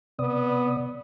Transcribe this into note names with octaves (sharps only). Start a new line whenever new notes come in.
C3 B3 D5 D#6